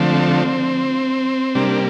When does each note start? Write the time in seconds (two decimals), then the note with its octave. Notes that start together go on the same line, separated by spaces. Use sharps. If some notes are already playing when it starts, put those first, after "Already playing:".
Already playing: D3 F3 A3 C4
1.55 C3 G3 A#3 D4